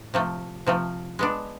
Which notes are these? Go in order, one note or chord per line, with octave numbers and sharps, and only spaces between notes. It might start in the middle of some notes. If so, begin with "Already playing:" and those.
Already playing: A2
C3 F3 A3
C3 F3 A3
G#3 B3 D4